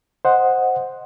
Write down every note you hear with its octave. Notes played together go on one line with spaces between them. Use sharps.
C5 D#5 F#5